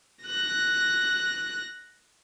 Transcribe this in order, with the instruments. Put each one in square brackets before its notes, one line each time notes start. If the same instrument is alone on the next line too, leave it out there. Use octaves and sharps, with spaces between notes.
[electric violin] F#6 A#6